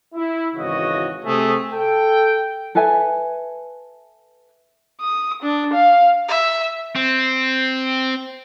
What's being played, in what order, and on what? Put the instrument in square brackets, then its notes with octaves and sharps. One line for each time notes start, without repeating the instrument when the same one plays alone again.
[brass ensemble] E4
G#1 C#3 E3 F#4 C#5 D#5
C3 A3 G#4
A4 G5
[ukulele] A4 B4 E5 G#5
[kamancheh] D#6
D4
F5
[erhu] E5
[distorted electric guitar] C4